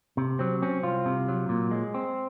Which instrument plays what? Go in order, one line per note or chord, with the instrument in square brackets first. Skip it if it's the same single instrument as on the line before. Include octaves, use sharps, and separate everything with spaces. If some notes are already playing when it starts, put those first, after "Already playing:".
[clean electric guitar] C3
F#3 C4
C4 C#4
C2 F4
C3
F#3
A#2
G#3
C4